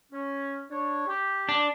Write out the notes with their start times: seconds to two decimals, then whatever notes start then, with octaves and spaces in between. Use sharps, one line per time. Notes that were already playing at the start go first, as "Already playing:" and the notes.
0.12 C#4
0.70 D4 C#5
1.07 G4
1.49 D4